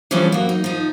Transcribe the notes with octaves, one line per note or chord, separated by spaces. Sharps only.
E3 F3 G3 G#3 C#4 D4
F#3 A#3
D#4
F3 D#4